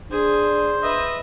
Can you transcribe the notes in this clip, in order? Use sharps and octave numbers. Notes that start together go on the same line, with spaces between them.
D4 G#4 C5
B4 D#5 E5